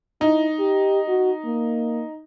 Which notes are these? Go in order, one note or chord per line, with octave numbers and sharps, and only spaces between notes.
D#4 E4
G4
F#4
A#3